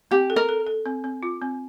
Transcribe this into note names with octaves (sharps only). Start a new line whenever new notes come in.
C4 G4
A4
A#4
A4
A4
C4
C4
F4
C4